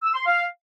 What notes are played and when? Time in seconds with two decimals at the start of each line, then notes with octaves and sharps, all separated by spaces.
0.03 E6
0.14 C6
0.25 F5